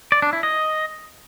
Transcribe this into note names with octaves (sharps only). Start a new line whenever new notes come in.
D5
D4
E4
D#5